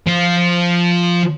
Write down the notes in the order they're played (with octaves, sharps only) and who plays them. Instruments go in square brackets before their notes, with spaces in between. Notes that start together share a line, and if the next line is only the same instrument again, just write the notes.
[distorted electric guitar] F3 F4